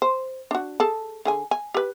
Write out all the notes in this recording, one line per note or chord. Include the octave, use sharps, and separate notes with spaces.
C5
D4 F#4
G#4 A4 A5
D3 G#4 G#5
G#5
G4 B4